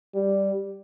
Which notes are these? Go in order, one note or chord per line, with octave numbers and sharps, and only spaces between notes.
G3